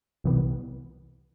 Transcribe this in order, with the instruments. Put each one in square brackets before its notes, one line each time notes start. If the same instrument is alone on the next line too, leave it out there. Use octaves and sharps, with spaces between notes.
[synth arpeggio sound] C2 C3 E3 G3 B3